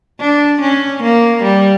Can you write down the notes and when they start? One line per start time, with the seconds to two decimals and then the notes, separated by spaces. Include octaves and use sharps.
0.20 D4
0.61 C#4
1.02 A#3
1.43 G3